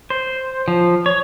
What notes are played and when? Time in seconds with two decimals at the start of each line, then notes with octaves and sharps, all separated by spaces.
0.10 C5
0.68 F3
1.06 C#5